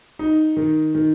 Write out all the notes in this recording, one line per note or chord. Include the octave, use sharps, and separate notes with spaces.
D#4
D#3
D#3